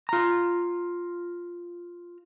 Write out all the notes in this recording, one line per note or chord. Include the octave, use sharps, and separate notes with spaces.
F4 A#5